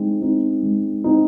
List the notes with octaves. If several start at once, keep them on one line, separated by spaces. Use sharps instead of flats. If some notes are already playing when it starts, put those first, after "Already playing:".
Already playing: G#3 C4 D#4
C4 D#4
G#3
C4 D#4